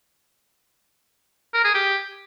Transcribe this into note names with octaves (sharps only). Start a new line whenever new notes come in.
A#4
G#4
G4